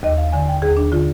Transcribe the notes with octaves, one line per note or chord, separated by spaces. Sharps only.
D#2 D#5
F5
D3 G#5
G5
D#2 G#4
D4
D3 F4